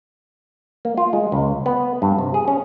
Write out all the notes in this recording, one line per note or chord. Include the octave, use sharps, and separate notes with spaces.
A#3
F4
G#3
C#2
B3
G2
C3
G#4
C#4